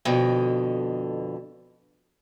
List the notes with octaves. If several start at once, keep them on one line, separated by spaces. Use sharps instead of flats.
F2 B2 D3